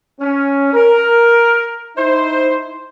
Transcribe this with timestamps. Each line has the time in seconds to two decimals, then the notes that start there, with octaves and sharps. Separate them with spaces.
0.21 C#4
0.74 A#4
1.96 D#4 E4 C5